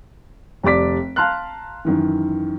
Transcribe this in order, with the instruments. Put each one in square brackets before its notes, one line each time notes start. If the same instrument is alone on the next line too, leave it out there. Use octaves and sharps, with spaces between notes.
[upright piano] F1 G3 D5 D6 B6
F5 A5 A#5 C6 F6 F#6
F#2 D#3 E3